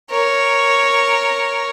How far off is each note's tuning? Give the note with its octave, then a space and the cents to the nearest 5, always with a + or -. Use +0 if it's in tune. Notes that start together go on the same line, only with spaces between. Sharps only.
A#4 +0 C#5 +0